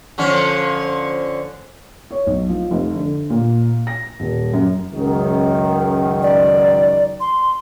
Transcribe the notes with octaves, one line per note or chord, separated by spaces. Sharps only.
D3 F3 C#4
C#5
B1
F3
F1
D3
A#2
A#6
D#1
F#2
C#2 F#2 D#3
D5
C6